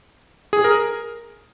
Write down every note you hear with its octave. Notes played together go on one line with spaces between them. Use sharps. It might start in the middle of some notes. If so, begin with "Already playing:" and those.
G#4
A#4